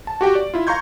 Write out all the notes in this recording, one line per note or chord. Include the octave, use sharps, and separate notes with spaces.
A5
F#4 G4 G5
D5
E4 F4
F5 A#5 C6 C#6 G6 G#6